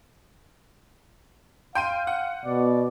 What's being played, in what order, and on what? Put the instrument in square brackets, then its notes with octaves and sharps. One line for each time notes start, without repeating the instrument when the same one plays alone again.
[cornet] F5 [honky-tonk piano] G5 C6 D#7
[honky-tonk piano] F#5
[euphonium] B2 [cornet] D5